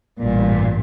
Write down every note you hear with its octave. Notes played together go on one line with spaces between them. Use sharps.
A1 G2 A#2